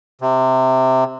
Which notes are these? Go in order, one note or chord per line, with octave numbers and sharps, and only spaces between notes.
C3